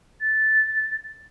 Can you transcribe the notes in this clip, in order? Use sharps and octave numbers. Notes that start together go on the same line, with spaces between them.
A6